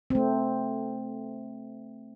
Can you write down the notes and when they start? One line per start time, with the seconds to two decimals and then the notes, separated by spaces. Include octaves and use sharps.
0.10 A3 C4